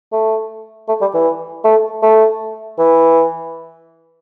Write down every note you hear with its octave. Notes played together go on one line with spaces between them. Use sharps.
A3
A3
G3
E3
A3
A3
E3